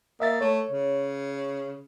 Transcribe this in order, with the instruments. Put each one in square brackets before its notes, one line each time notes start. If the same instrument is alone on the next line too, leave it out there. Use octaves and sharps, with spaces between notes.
[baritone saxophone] A#3 [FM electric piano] D#5 E5 A6
[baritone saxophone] A3 [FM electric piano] C#5
[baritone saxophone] C#3